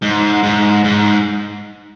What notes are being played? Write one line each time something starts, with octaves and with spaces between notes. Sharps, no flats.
G#2
G#2
G#2